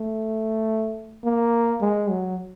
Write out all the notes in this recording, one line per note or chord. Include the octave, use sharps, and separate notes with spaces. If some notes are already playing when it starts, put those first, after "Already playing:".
Already playing: A3
A#3
G#3
F#3